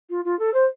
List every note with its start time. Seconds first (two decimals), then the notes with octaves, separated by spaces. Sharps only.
0.10 F4
0.24 F4
0.39 A4
0.54 C5